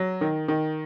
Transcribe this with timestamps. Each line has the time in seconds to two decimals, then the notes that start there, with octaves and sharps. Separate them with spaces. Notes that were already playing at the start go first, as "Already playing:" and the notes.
Already playing: F#3
0.21 D#3
0.48 D#3